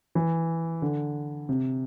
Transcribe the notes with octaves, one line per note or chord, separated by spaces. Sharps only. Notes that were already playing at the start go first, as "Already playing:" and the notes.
E3
D3
C3